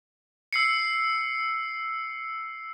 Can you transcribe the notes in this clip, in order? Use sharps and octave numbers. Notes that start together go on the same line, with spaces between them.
E6 C7 C#7